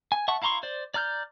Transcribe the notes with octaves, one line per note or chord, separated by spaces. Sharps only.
G#5
E5 F#5 A5 C#6
E4 F5 A#5 C6 C#6
C5 D5
D5 A#5 F6 G6